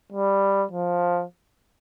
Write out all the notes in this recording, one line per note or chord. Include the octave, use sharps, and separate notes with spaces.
G3
F3